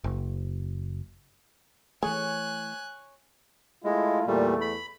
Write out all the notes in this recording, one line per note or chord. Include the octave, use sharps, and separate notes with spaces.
F#1
E3 A3 G#4 C#5 G#5 F#6
G#3 A3 E4 F4
E2 A#2 G3 A3
B5